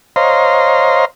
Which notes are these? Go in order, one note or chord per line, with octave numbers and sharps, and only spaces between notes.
C5 C#5 D#5 F5 A#5 C6